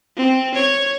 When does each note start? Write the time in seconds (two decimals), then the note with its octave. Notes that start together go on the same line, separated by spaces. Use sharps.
0.17 C4
0.54 C#5